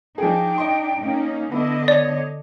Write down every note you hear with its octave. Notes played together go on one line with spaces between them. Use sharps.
F3 D4 D#4 G#4 G5
D#5 C6
A#3 C#4 D#4
D3 B3 D4 E4 D#5
C#5 D5